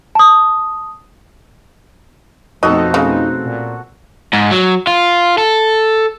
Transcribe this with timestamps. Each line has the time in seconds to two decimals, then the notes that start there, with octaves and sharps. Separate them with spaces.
0.15 A5 D#6
2.63 F2 B2 A3 C4 D#4 F#4 A4 D#5
2.94 C#3
3.45 A#2
4.33 G#2
4.51 F#3
4.87 F4
5.38 A4